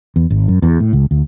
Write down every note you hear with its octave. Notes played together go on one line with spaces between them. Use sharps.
E2
G#1
F#2
E2
A2
C#2
D2